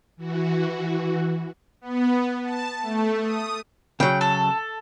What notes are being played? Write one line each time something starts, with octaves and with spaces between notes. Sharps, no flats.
E3 F#4
B3
A5
A3
D#6
C#3 F#3 G5
A4 A5